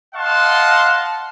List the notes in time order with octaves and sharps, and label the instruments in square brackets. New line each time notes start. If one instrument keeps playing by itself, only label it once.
[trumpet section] D#5 F5 F#5 A5 C6